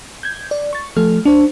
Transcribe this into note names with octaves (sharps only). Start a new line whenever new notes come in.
G6 G#6
D5
C#6 A6
F3 A3 A4 F6
D4 C5